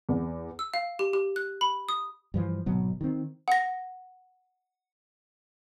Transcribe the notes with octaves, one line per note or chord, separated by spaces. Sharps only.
E2
E6
F5
G4
G4
F#6
B5
D#6
G2 E3 F3
G#1 B2 F#3 B3
D#3 C4
F#5 A#6